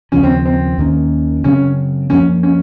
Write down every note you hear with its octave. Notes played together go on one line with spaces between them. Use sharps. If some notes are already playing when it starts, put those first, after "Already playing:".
D#2 C#3 F3 C#4
C4
C4
D#2 D#3 A#3 C#4
F#2 C#3 F#3 C4 C#4
F#2 F3 A#3 C#4
C#4